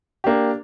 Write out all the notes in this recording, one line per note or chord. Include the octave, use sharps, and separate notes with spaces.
A#3 D4 G4